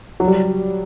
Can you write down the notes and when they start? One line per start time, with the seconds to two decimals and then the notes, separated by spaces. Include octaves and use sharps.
0.20 F#3
0.28 G3